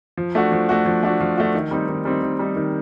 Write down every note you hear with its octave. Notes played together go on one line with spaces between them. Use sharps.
F3
A3 D4 F#4
F3
A3 D4 F#4
F3
A3 D4 F#4
F3
A3 D4 F#4
D#3
G3 C4 D#4
D#3
G3 C4 D#4
D#3
G3 C4 D#4
D#3